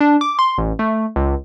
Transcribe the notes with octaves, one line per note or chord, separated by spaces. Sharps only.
D4
D6
C6
A1
A3
C#2